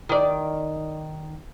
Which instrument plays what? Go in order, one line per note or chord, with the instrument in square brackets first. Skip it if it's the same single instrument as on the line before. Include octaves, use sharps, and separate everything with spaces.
[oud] D#3 D5